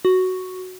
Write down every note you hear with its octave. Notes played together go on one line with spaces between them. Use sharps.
F#4